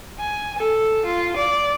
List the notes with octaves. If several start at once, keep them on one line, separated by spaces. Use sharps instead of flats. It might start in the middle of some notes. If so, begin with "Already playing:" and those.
G#5
A4
F4
D5